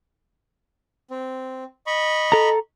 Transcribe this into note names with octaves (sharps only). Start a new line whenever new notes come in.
C4
D#5 B5 C#6
A4 A#5